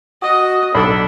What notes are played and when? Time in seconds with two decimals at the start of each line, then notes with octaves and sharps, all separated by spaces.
0.22 F#4 D#5 D#6
0.75 B1 D4 A4 B5